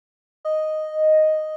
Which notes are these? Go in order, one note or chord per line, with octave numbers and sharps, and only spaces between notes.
D#5